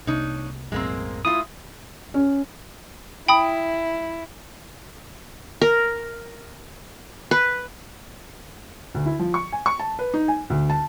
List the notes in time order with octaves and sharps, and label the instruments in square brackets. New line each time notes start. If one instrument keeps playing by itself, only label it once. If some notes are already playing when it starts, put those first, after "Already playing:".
[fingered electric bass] C2 C3 A#3 [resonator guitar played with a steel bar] D4 D#4 C#5
[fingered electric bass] B1 F#2 A2 [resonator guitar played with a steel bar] G#3 A#3 C4
[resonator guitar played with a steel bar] A2 E4 F4 [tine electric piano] D#6
[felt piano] C#4
[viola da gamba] E4 [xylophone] G5 B5 D#6
[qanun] A#4
B4
[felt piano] D2
E4
F3
C#6
G#5
C#6
A5
B4
D#4
G#5
D2
A5